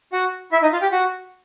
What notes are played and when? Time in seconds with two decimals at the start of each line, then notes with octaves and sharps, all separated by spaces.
0.13 F#4 F#5
0.52 E4 E5
0.62 D#4 D#5
0.73 F4 F5
0.82 G4 G5
0.92 F#4 F#5